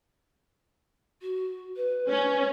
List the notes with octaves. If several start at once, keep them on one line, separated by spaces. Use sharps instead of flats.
F#4
B4
C#4